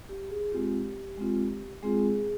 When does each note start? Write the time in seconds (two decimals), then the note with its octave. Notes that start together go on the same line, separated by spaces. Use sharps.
0.09 G4
0.30 G#4
0.52 G#3 C4 F4 G4
1.18 G#3 C4 F4
1.82 G#3 C4 F4 G#4